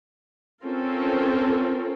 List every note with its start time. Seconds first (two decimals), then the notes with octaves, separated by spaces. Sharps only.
0.65 C4 C#4 F4 A4 A#4